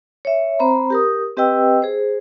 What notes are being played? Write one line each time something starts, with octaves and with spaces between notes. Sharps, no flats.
C#5 E5
C4 C5 A#5 B5
G4 A#4 D#6
C4 G4 B4 D#5 G5 E6
G#4 C5